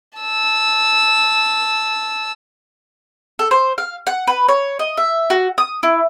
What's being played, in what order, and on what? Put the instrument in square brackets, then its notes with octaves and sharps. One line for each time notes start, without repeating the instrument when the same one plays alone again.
[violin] A5 E6
[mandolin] A4
C5
F5
F#5
B4
C#5
D#5
E5
F#4
D#6
E4